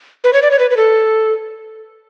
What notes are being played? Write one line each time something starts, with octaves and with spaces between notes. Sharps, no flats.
B4
C#5
D5
C#5
B4
B4
A4